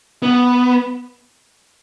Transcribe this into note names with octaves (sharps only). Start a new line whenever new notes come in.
B3